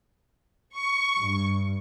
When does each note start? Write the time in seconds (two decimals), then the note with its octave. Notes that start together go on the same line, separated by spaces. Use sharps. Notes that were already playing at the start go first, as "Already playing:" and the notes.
0.76 C#6
1.15 G2